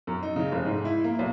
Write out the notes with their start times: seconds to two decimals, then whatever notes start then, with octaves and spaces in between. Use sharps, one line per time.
0.07 F#2
0.23 D#4
0.36 C#3
0.52 F1
0.65 G#2
0.85 E4
1.04 A#3
1.19 B1